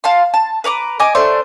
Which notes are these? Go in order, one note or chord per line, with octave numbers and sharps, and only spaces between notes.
F5 A5 C6
A5
B4 A#5 C#6 D6
D#5 G#5 D6
A3 D4 C5